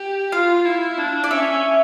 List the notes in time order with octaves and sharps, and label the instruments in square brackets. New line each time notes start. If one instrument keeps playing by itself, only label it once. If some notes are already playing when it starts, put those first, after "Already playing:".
Already playing: [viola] G4
[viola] F4 [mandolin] F5
[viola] E4
D4
[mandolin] D5
[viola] C#4 [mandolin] E5